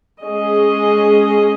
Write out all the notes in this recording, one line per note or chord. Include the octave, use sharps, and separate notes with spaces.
G#3 C#4 G#4 D#5